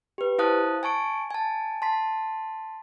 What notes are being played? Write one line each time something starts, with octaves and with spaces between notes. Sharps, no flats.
G4 B4
E4 C5 F5 A5 D#6 F#6
G#5 A5 C#6 D7
G#5 A5
A5 C6 B6